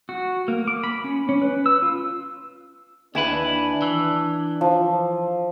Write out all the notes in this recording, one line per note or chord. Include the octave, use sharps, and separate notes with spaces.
F#4
A#3
D6
B5
C#4
C#4
B4
E6
F4
D#2 D4 E4 B4 G#5
E3
F3